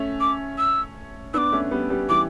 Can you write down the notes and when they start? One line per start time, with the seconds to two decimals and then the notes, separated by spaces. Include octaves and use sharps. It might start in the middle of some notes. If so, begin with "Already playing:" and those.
Already playing: A3 C#4
0.20 D6
0.58 E6
1.34 B3 D4 D6 E6
1.52 A3 C#4
1.71 G3 B3
1.90 G3 B3
2.09 E3 G3 D6